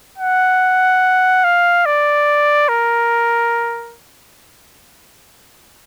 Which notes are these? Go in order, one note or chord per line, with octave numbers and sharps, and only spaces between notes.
F#5
F5
D5
A#4